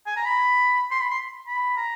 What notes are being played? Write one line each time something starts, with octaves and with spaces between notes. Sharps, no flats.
G#5
A#5
B5
C6
B5
C6
B5
A#5